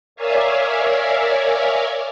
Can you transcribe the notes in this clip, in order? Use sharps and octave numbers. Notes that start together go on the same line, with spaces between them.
A#4 C#5 D5 E5 F5 G#5